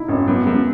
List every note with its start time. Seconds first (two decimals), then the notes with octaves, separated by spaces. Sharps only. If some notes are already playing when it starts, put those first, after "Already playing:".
Already playing: D#4 E4
0.08 G#1 C#4
0.27 F#2 B3
0.46 F#2 G#3